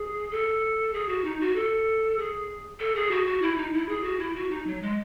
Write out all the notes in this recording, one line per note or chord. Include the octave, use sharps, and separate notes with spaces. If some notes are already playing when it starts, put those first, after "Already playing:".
Already playing: G#4
A4
G#4
F#4
D#4
F#4
A4
G#4
A4
G#4
F#4
F#4
E4
D#4
E4
G#4
F#4
E4
F#4
D#4
F#3
G#3